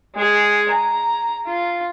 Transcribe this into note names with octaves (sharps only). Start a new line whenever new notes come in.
G#3 G#4
A#5
F4